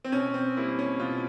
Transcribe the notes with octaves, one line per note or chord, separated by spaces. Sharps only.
C4
B2 C#4
C4
G3 A#3 E4
C#4
B2 F4